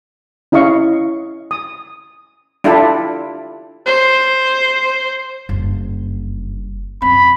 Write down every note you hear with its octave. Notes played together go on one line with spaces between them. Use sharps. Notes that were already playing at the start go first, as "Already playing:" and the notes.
C#4 E4 D#5 F5 C#6
D#6
D4 E4 F4 G4 A4
C5
F#1 G2
F#2 C4 B5